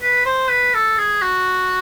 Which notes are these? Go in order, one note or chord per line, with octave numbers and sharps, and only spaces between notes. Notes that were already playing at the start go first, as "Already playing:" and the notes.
B4
C5
B4
A4
G#4
F#4